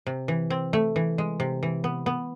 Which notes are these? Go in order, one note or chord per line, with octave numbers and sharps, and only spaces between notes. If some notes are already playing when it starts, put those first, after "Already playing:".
C3
E3
C4
A3
E3
G#3
C3
E3
B3
B3